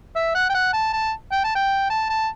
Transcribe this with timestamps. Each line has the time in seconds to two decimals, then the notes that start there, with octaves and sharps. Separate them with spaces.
0.16 E5
0.35 F#5
0.49 G5
0.54 F#5
0.73 A5
0.93 A5
1.32 G5
1.44 A5
1.55 G5
1.90 A5
2.10 A5